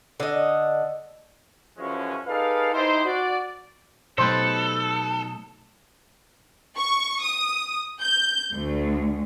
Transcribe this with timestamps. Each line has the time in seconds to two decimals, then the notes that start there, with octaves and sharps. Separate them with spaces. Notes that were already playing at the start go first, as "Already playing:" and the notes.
0.20 D3 D#5
1.78 F#2 C#3 E3 F3 G#3 C#4
2.27 D#4 G#4 A4 B4 D5 F5
2.73 D#4 E4 G4 C5
3.05 F#4 D5
4.18 B2 F#3 A3 D#4 G4 A4 B4 C5
6.77 C#6
7.22 D#6
8.01 G6
8.53 D2